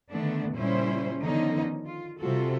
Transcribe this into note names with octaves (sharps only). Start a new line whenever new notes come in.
D3 D#3 A3 B3 D4
A#2 C#3 G3 C#4 E4 C5
D3 D#3 F3 B3 C#4 D#4
F4
C3 G3 F4 F#4 A4